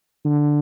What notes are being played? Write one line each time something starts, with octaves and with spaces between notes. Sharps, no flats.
D3